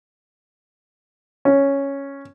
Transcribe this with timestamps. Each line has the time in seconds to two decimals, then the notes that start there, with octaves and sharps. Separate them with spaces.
1.45 C#4